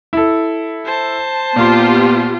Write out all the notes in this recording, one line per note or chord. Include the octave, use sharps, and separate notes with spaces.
E4 A4
C5 A5
A#2 B3 F4 G4 C6